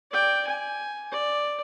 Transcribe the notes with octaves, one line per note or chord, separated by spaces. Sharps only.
D5 G5
G#5
D5